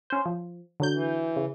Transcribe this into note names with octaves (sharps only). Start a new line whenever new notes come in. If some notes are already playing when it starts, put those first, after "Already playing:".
C#4 C5
F3
D3 F#3 G6
E3
C#3